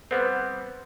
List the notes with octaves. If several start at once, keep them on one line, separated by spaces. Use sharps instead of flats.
G3 B3 C4 B4 C5 F#5